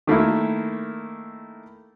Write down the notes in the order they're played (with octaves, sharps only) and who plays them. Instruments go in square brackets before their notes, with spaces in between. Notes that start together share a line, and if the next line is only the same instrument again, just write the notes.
[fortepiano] D#3 A3 A#3 E4